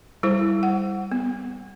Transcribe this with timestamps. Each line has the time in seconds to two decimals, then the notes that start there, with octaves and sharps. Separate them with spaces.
0.23 G3 E4 C5
0.63 F#5
1.12 B3